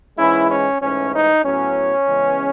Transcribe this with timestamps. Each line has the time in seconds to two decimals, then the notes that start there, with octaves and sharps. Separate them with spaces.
0.18 G#2 E3 G#3 C#4 E4
0.50 C#4
0.81 G#2 E3 A3 C#4
1.12 D#4
1.44 A2 F#3 B3 C#4
2.07 C#3 E3 G#3 B3